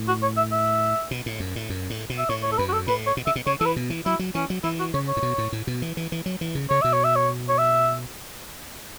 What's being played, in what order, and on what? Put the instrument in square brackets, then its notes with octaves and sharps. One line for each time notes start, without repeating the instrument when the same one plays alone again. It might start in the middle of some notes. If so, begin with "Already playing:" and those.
Already playing: [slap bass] A2
[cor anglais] F#4
C#5
E5
E5
[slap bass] B2
A2
F#2
A2
F#2
A2
B2
[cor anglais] E5
[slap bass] A2 [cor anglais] C#5
[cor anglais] C#5
A4
[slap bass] F#2 [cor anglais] B4
[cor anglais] F#4
A4
[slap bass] A2 [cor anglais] B4
[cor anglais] C#5
[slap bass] B2
[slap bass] C#3 [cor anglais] E5
[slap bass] B2
[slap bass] C#3 [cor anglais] C#5
[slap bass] E3 [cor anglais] A4
[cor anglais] B4
[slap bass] B2
E3
[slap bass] F#3 [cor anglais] E4
[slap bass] F#3
[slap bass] E3 [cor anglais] C#4
[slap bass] F#3
[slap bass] E3 [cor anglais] E4
[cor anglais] F#4
[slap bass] C#3 [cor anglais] C#5
[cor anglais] C#5
[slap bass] A2
B2
A2
A2
B2
E3
E3
E3
F#3
E3
C#3
[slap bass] C#3 [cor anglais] C#5
[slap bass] B2 [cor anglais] E5
[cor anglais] C#5
E5
C#5
C#5
E5